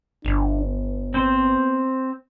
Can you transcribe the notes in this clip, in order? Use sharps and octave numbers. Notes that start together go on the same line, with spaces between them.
G1 D4
B3
C4 C5